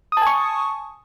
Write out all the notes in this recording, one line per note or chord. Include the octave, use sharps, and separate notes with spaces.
G#5 A5 C#6 D#6